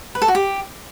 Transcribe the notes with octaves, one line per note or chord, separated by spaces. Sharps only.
B4
A4
F#4
G4